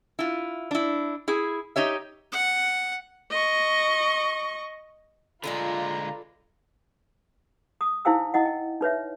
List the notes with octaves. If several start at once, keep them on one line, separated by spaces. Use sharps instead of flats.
E4 F4
D4 E4
E4 G#4
D#4 G4 C#5 E5
F#5
D#5 C#6
D3 G#3 F4 A4 B4 D5 A#5
D#6
D#4 E4 C5 F5 G5 E6
E4 D#5 F#5
G5
D#4 B4 C#5 E5